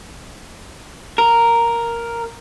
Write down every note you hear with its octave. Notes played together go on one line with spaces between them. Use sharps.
A#4